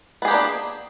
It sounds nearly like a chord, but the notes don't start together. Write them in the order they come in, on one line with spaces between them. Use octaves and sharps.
B3 G#4 G4 A#3 D4